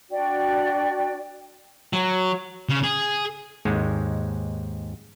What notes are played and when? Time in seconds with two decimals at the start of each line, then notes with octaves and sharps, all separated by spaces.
0.10 D4 F#4 D5 G5
1.93 F#3
2.69 C#3
2.84 G#4
3.65 D#2 G#2 G#3